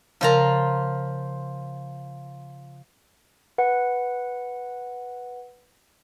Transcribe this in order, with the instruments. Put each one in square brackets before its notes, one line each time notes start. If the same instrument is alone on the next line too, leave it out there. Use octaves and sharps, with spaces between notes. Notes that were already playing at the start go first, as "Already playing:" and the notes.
[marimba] C#3 A#4 [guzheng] F3 F4 A#5
[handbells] B4 F#5